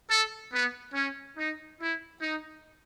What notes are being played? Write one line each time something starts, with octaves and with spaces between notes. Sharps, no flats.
A4
B3
C#4
D#4
E4
D#4